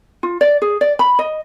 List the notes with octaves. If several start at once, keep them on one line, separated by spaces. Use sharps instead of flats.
F4
D5
G#4
D5
B5
D#5